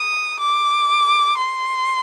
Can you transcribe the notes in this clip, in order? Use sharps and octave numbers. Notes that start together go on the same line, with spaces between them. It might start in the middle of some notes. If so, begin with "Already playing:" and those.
Already playing: D#6
D6
C6